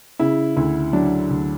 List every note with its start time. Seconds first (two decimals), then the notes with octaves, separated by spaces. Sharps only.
0.19 C#3 E4
0.56 D2 E4
0.93 F#3 D4
1.30 D2